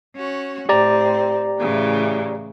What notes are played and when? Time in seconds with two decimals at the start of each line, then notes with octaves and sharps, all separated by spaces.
0.15 C#4 F#4
0.69 A2 C4 G4 D5 A#5
1.60 A2 C#3 E3